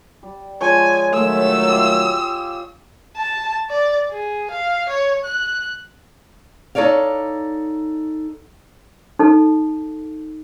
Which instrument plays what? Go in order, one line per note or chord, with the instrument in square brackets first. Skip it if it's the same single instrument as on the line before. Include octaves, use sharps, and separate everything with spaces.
[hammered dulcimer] G3
[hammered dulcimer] F3 G#3 C#5 [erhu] G#5
[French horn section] D#3 F#3 A3 [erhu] E6
[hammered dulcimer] F4 G4 F5
[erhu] A5
D5
G#4
F5
C#5
F#6
[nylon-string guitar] D#4 A4 C#5 D5 F5
[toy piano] D#4 A4